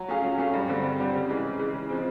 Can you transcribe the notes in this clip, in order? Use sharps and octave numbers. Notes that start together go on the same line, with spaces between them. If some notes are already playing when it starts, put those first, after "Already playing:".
Already playing: F#3
A3 C#4 F4 G#4
F#3
A3 C#4 F4 G#4
G2
D3 G3 C4
G2
D3 G3 C4
C#3
E3 G#3
C#3
E3 G#3
C#3
F3 G#3 C4